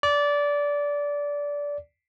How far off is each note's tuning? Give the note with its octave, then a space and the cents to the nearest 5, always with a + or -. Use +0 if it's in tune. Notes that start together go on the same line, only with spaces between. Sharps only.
D5 -20